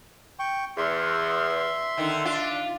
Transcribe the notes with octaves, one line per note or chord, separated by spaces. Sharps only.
G5 C#6
E2 E5 C6
D3 D#3 D#4
D4 F4